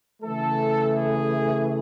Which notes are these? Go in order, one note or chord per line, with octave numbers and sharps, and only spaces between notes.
C#3 E3 A3 A4
G#4